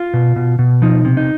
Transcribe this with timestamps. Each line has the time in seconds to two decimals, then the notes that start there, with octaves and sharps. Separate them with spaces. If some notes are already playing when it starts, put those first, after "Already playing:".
Already playing: F4
0.14 B2
0.36 B2
0.59 B2
0.82 F3 D#4
1.05 C3
1.17 D#4